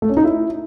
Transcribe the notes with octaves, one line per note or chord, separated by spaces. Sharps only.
A3
C#4
D#4
E4